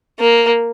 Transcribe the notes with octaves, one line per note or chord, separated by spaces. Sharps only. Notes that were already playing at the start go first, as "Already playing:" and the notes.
A#3